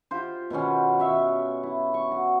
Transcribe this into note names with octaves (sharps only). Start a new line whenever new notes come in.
F4 G4 C5
B2 D#3 B3 C#4
C#5 E5 F5
E4
C#6
F#4